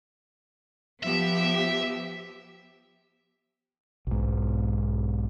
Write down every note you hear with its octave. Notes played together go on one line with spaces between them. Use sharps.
F3 B3 G4 E5
B1 G#2